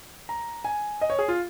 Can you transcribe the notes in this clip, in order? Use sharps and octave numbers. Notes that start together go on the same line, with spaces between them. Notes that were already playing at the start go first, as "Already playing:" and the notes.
A#5
G#5
D#5
C#5
G#4
F4